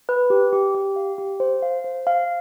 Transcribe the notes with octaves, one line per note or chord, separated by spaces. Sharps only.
B4
G4
G4
G4
F5
G4
C5
F5
C5
F5